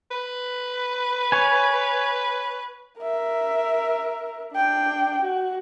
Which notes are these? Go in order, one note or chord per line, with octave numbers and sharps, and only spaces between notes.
B4
C#5 G#5
A#4 E5
D4 G5
F#4